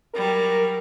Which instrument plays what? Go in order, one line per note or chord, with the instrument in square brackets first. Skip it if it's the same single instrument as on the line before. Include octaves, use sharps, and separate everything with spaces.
[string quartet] F#3 G3 [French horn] A#4